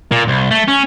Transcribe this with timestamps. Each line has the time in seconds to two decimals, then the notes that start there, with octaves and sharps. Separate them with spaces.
0.12 A#2
0.28 C2
0.51 A3
0.68 C#4